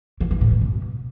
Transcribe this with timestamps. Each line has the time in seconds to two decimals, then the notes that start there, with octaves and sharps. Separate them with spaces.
0.21 E3
0.31 E3
0.41 A2
0.51 G2
0.61 B2